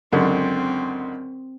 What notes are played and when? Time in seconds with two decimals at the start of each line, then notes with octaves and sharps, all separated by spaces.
0.12 C#2 F#2 D3 C4